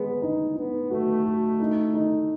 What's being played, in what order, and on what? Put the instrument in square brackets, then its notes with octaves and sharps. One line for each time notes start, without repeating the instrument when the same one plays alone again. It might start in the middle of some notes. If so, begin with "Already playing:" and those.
Already playing: [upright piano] G#3 [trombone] B3
[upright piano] D#4
[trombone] B3 [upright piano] D#4
[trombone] A3 [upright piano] F#4
[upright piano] F#4
D#4
D#4